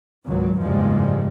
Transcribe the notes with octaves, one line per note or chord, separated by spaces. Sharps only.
G#1 C#2 F#3
F#1 E2 G#2 F3 G3 G#3